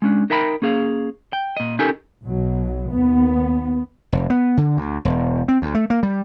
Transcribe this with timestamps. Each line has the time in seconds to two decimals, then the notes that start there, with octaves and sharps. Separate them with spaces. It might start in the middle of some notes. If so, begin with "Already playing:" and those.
0.02 G#3 C#4 D4
0.30 D#4 A#4 E5 G5 A#5 B5
0.62 A#3 C#4 G#4 F5
1.33 G5
1.57 A#2 D#5
1.79 C#4 D#4 G4 A4 A#4 G#5
2.25 B1 B2 F#3
2.89 D#2 B3
4.12 F1
4.30 B3
4.57 D3
4.77 D2
5.05 E1
5.48 C4
5.62 D2
5.74 A3
5.90 A#3
6.03 G3